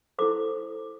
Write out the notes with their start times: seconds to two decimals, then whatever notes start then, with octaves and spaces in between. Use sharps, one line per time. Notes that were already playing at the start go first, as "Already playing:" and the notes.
0.19 E4 A4 C5 D6